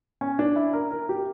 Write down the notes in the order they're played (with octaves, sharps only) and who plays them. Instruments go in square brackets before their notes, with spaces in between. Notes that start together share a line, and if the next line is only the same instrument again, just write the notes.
[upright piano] C#4
D4
E4
A#4
A#4
G4